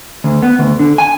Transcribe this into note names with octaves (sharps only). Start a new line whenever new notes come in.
D2
B3
D2
D3
G#5